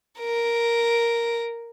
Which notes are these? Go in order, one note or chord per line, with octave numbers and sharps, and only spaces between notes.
A#4